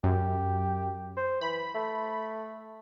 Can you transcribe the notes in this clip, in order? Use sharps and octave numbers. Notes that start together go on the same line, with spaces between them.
F#2 G4
C5
E3 B5
A3